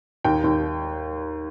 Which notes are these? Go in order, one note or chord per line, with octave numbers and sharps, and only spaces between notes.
D#2 G5
D#2